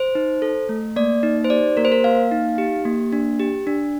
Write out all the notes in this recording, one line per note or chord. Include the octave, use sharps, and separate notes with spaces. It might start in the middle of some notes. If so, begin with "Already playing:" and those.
Already playing: C5
D#4
A4
A3
A#3 D5
D#4
C5
G4 D5
A#3 A#4
C5
A#4
A#3 F5
D#4
G4
A#3
D4
G4
D4